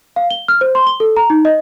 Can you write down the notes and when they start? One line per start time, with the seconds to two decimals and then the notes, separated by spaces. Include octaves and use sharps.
0.16 F5
0.30 G7
0.48 F6
0.61 C5
0.75 C6
0.87 G7
1.00 A4
1.17 A#5
1.30 D#4
1.45 D#5